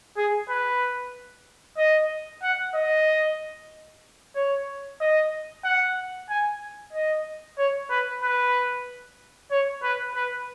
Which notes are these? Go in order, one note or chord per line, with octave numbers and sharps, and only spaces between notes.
G#4
B4
D#5
F#5
D#5
C#5
D#5
F#5
G#5
D#5
C#5
B4
B4
C#5
B4
B4